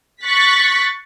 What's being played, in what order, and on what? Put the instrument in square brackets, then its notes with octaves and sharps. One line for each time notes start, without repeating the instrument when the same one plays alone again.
[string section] C#6 F#6 A6 B6